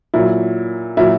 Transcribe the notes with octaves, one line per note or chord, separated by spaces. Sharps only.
A#2 F#3 E4
A#2 F#3 E4